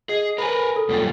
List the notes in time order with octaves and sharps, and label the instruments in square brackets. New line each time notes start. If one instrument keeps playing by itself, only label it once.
[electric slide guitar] G#4 [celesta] D#5 C7
[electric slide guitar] A#4 B4 [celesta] G#5 B5
[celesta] A4
[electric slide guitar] F#2 A#2 G3